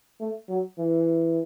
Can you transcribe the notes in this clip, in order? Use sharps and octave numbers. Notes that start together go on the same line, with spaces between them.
A3
F#3
E3